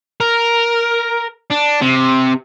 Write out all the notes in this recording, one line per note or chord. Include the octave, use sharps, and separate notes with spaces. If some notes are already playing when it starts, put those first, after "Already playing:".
A#4
D4
C3